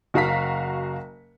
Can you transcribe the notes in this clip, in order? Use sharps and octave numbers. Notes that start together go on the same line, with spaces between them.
F#1 F#4 F5 A#5 B6